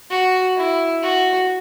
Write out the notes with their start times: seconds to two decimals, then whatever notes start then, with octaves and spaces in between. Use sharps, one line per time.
0.11 F#4
0.57 E4
1.03 F#4